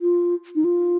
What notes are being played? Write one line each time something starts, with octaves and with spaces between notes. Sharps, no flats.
F4
D#4
F4